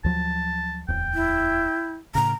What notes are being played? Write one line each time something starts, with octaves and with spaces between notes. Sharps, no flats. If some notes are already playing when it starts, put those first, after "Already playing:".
D2 F3 F#3 A5
D1 E2 G5
E4
A2 C#3 A#5